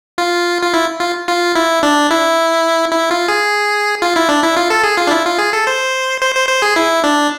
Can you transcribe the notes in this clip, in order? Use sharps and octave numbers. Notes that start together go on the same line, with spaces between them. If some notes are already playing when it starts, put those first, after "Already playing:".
F4
F4
E4
F4
F4
E4
D4
E4
E4
F4
G#4
F4
E4
D4
E4
F4
A4
G#4
F4
D4
E4
F4
G#4
A4
C5
C5
C5
C5
G#4
E4
D4